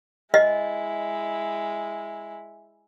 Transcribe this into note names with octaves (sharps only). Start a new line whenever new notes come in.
G#3 E4 D#5